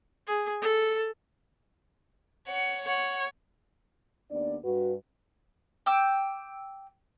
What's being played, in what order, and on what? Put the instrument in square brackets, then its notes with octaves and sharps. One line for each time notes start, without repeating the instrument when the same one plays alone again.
[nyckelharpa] G#4
A4
[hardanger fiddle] C#5 F#5
[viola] C#5 [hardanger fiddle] F#5
[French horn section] D#2 B3 D4 D5
G2 F#4 B4
[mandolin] G5 D6 E6